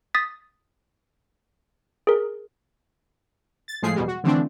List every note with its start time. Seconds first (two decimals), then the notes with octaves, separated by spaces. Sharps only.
0.14 D#6 A6 B6
2.07 G#4 A#4
3.68 A6
3.82 A2 F3 G#3 A3 G#4 C7
3.95 E2 B2 G3 G#3
4.08 F#4
4.24 D3 E3 F3 A3 C4 D4